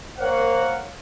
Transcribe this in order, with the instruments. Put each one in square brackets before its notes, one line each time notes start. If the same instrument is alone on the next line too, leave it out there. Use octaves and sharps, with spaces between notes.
[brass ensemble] A#3 A#4 C5 C#5 F5 F#5